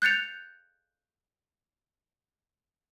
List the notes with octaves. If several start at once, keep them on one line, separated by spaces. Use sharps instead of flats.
F#6 G6 A6 C#7 F7